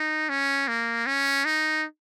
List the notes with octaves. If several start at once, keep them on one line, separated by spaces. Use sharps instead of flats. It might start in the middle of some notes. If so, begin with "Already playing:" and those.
Already playing: D#4
C#4
A#3
C#4
D#4